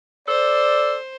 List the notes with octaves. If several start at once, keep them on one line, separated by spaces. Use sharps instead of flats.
A4 C5 D5